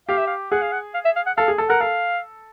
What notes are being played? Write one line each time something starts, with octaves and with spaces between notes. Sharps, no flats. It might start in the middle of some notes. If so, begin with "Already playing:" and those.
G4 F5
E5
F5
G#4 F#5
F5
F#5
F5
E5
F5
F#5
A4 F5
G#4
A4
A#4 F#5
A4 F5